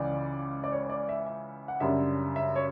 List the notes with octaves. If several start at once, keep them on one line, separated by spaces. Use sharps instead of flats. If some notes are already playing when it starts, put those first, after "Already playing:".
Already playing: C#2 C#3 E3 D5
D5
C#5
C#5
D5
E5
E5
F#5
F#2 C#3 G3 D4 E5
E5
C#5